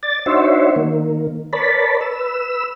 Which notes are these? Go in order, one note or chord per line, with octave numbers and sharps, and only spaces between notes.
D5 A6
D4 D#4 F#4 C5 C#5 E5
D#3 A#3
A#4 B4 C#5 D5 A5 B5
B4 E6